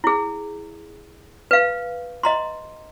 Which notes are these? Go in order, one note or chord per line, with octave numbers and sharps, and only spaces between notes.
E4 G#4
B4 F5
D#5 A#5 C6